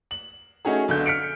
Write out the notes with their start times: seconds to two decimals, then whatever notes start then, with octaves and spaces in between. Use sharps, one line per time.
0.11 F#7
0.65 A3 C#4 D#4 F#4 G#4
0.88 B1 D3 G6
1.06 F6 B6 C#7 D7